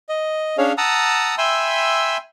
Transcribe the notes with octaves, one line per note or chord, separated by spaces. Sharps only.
D#5
C#4 D4 G#4 C#5 F5
F#5 A5 A#5 D#6 E6
E5 G5 G#5 B5 C6 E6